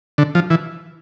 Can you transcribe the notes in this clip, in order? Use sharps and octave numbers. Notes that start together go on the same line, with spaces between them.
D3
F3
E3